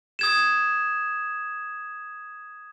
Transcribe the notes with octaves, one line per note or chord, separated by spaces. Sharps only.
D#6 G#6 E7